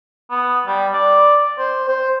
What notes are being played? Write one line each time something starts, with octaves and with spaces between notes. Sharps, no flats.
B3
G3
D5
C5
C5